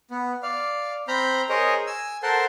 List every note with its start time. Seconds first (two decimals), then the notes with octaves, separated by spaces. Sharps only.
0.11 B3
0.43 D5 F5
1.08 C4 A#5 B5 F6 G6
1.49 G#4 A#4 C5 C#5 D#5
1.87 G#5 E6
2.23 A4 A#4 C5 F#5 A5 C6